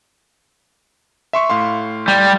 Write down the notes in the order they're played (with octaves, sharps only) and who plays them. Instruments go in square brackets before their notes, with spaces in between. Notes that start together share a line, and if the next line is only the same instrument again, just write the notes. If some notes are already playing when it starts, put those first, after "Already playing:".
[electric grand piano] E5 C6 C#6
A2 F5 C6
[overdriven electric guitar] G3